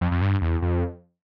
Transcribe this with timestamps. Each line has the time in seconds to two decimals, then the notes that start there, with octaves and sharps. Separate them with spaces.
0.01 F2
0.11 F2
0.22 G2
0.42 E2
0.62 F2